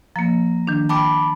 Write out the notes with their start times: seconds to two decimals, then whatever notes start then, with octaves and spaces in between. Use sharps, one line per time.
0.16 F3 A#3 A#5
0.67 D#3 D4
0.89 G5 A5 B5 D6